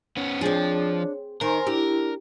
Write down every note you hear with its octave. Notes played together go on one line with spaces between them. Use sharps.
B3 C#4
F3 C4 D4 G#4 C#5
D#3 D#4 A#4 C5 G#5 C6
D4 E4 G4